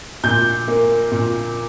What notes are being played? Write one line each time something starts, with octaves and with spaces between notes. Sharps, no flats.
A#2 G6
A#3
A#2